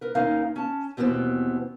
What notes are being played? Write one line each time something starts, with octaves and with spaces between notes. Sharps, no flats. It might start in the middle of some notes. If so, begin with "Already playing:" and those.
A#4 B4
D#2 C#4 D#4 A#4 F5
C#4 A5
D#2 B2 E3 B3 C4